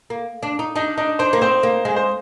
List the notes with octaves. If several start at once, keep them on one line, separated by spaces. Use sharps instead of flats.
A#3
D4
D#4
D4 D#4
D4 D#4
D4 C5
A#3
C4 C5
A#3
G#3
C5